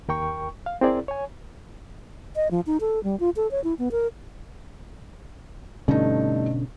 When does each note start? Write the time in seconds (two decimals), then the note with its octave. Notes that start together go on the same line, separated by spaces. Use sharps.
0.08 D#2 A#4 G5 C#6
0.66 F5
0.81 C4 E4 G#4 A#4 D5
1.08 C#5 G#5
2.36 D#5
2.51 F3
2.67 D#4
2.81 A4
3.04 G3
3.20 F4
3.36 A4
3.51 C#5
3.64 E4
3.79 B3
3.91 A#4
5.88 G2 B2 D3 A3 C#4 D#4